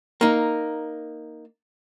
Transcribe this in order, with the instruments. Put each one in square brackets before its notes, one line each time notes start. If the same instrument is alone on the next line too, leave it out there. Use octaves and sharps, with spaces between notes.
[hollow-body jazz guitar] A#3 D#4